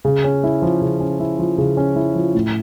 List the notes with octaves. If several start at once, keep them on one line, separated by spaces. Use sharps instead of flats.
C#3
C#4
E4
F3
C#3
C#4
E4
F3
C#3
C#4
E4
F3
A2